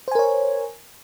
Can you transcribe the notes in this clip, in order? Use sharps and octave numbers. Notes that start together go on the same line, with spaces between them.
A#4 C5 C#5 G#5